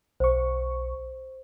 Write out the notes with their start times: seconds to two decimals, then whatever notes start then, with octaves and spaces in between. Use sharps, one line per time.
0.20 B1 C5 C#6